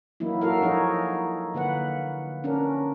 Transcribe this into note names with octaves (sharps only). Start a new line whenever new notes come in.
E3 F#3 A#3 D#4 E4
F#4 A4 A#4 F5
F3 D#4 G#4 A4 C#5
D3 A#3 B4 F#5
C#4 D4 A#4